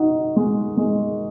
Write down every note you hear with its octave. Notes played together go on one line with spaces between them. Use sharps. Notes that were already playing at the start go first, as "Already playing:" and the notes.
Already playing: D#4 F#4
G#3
G#3